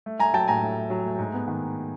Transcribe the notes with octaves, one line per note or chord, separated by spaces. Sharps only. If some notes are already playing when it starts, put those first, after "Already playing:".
A3
A3 G#5 A#5
F#3 G5 A5
A2 G#5 A#5
A3
A3
F#3
A3
G#2
B3
D#3